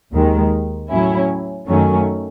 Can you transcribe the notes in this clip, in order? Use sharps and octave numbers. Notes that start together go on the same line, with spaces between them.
D#2 D#3 G#3
A2 F#3 C#4 E4
F#2 D#3 F#3 A3 C#4